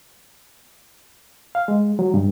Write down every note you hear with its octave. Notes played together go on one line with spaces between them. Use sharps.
F5
G#3
F#3
G2